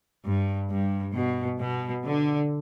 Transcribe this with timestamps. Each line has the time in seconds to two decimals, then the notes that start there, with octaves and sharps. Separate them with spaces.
0.25 G2
0.70 G2
1.15 B2
1.60 B2
2.04 D3